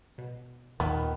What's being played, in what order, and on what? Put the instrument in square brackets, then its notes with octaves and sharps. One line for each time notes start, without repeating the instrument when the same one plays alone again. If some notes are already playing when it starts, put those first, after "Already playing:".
[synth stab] B2
[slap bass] D#2 [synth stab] A#2 [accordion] D#3 [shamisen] B3